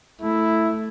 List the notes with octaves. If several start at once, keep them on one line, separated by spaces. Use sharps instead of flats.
A3 E4